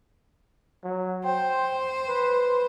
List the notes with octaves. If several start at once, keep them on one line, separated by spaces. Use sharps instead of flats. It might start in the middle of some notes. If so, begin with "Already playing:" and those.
F#3
C5 G5
B4